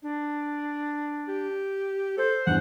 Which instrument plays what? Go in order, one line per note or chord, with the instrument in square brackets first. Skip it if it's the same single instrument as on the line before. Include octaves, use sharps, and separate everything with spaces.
[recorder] D4
[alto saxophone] G4
[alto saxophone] A4 [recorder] C5
[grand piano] E2 G2 [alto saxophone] F#5